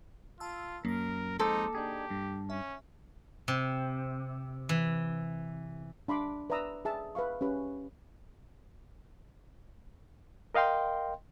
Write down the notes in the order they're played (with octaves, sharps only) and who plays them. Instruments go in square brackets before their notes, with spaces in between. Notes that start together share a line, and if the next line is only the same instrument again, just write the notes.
[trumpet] F4 [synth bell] A5 E6
[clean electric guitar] F#2 [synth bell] A#3 A#6 [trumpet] A#4
[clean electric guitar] F2 G#3 C5 [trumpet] D#4 [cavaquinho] A4 D6
[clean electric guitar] D4 D#4 G#4 [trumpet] G4
[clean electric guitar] G2
[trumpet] C#4 [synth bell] E5
[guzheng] C3
E3
[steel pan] D4 B5 C6 D6
B4 D5 E5 A#5 D#6 E6
G#4 E5 A5
B4 E5 F5 C#6
C#4 G4 B4
[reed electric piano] A#4 D#5 F5 G5 C6